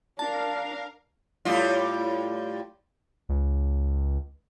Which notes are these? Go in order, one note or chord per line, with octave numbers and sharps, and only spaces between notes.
D4 A#4 F5 A5
A2 G3 F4
C#2